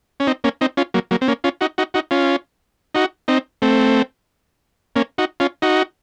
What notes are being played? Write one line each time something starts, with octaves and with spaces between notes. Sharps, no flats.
C#4
C4 D#4
A#3 C#4
C4 D#4
C#4 F4
F#3 A#3
F#3 A#3
C4
A#3 C#4
C#4 F4
D#4 F#4
D#4 F#4
D#4 F#4
C#4 F4
D#4 F#4
C4 D#4
A3 C4
A#3 C#4
D#4 F#4
C#4 F4
D#4 F#4